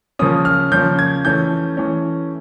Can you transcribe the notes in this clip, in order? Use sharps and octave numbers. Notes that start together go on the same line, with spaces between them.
C#3 F3 A#3 C#4 D#6
F6
C#3 F3 A#3 C#4 G6
G#6
E3 A3 C#4 G6
E3 A3 C#4